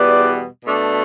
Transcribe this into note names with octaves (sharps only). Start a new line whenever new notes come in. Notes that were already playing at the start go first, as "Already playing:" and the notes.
Already playing: E2 B2 G3 B3 B4 D5
B2 A3 D4